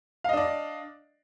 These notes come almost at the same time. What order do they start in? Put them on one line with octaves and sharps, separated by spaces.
F5 D#5 D4 D5